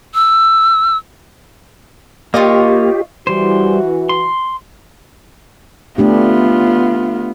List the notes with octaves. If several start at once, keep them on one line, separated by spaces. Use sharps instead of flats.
E6
A#3 F4 G4 C#5 D#5
E3 G3 F#4 C5
C6
A3 B3 D4 F4 G4